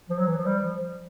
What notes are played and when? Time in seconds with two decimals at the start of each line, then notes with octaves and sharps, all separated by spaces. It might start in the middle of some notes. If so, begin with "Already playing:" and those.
0.10 F3
0.19 F#3
0.27 E3
0.37 F3
0.46 G3
0.64 F3